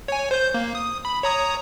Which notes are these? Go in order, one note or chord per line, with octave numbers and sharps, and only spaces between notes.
C#5 G#5
C5 G6
A#3
D#6
B5
C#5 A#5 D#6